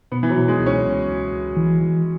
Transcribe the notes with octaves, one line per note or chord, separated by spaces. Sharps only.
B2 B3
E3
F#3
B2
G#3
C#2
C#4
C#2
C#2
C#2
E3
E3